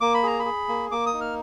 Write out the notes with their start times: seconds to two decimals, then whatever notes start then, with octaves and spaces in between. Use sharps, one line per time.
0.01 A#3 D6
0.14 B5
0.23 G#4 A#5
0.40 B5
0.45 G#4
0.69 A#3
0.91 A#3 D6
1.06 D#6
1.13 D#4
1.21 F6